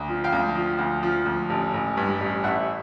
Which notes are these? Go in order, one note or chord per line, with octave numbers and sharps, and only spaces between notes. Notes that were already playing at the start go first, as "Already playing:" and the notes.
Already playing: D2
F3
F5 G5
D2
F3
D2
F3
D2
A1
A1
G2
A1
A1 E5 F#5